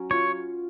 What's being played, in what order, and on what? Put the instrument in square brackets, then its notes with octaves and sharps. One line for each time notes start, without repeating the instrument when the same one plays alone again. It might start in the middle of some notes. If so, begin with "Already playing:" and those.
Already playing: [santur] F#3 C#4
[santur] F4 [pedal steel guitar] C#5